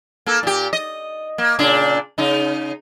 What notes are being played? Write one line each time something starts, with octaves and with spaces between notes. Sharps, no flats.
A#3 A4
A#2 G4
D#5
A#3
A#2 C#3 D4
C#3 D#4